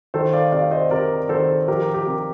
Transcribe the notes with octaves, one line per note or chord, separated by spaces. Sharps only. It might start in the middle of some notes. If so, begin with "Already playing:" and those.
D#3 A4 C5
D5 F5
C3 D5 F5
C5 D#5
C3 A#4 D5
D#3 A4 C5
F3 G4 A#4
G4 A#4
C3